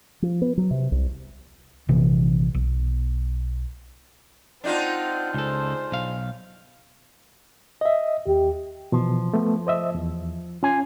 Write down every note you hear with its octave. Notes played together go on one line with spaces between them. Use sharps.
F3
B3
F#3
C3
C2
A#1 C3 E3
B1
C4 D4 D#4 F4 F#5
C#2 G#4 A4 C5
B1 F5
D#5 E5
D#2 G4
B2 E3 F3
A3 B3
C5 D#5 E5
E2
C#4 F4 G#5